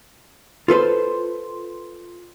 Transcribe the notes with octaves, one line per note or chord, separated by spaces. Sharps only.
F4 A4 B4 C5